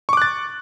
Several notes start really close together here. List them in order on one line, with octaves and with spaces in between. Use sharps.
C#6 D6 F#6 A6